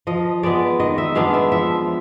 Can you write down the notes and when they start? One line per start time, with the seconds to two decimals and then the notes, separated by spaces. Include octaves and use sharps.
0.07 F3 D#5
0.43 G#3 B3 D5
0.80 D#3 D#5
0.98 E5
1.15 G#3 B3 D4 F5
1.34 E5
1.52 F3 E5